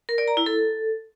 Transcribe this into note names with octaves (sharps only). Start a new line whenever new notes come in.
A#4
D5
A#5
E4
A4